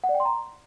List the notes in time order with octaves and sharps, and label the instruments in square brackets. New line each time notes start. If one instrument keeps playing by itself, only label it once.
[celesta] F#5
D5
G5
C6
A#5